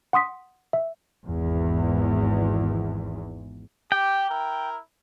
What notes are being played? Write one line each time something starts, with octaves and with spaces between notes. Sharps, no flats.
F#5 C6 D#6 B6
E5
G#1 E2
G4 G5
E4 A#4